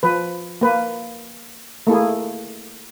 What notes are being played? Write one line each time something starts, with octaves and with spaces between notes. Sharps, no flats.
F3 B4
A#3 B4
A3 A#3 E4 G#4